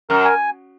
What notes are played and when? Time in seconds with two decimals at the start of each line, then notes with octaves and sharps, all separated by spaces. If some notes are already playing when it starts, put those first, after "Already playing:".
0.10 F#2 A#4
0.25 G#5